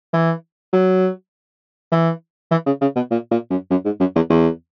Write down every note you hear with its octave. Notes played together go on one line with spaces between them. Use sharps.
E3
F#3
E3
E3
C#3
C#3
B2
A#2
A#2
F#2
F#2
G#2
F#2
E2
E2